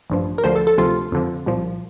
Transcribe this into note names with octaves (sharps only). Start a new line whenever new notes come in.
A1 G2 F3
A#4
D2 D3 F3 C5
A4
A4
D2 C3 F3 F4
F2 D3 F3
C2 A#2 F3